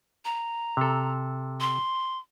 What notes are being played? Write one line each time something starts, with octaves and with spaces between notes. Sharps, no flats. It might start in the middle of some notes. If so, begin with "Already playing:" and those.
A#5
C3 A4
C6